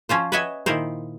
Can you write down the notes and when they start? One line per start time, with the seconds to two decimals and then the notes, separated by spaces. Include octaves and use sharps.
0.09 F3 C#4 F4 C5
0.32 B4 C#5 D#5 E5 F#5 G#5
0.66 A#2 D#3 E4 A#4 C5